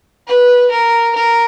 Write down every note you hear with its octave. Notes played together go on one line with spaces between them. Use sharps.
B4
A#4
A#4